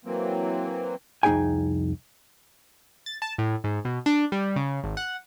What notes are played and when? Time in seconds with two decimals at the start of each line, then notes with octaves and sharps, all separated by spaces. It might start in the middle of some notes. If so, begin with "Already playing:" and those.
0.05 E3 F#3 A#3 C4
1.23 C2 F2 D#4 G#4 G5 G#5
3.06 A6
3.22 A5
3.38 A2
3.64 G#2
3.85 B2
4.06 D4
4.32 G3
4.56 C#3
4.84 G#1
4.97 F#5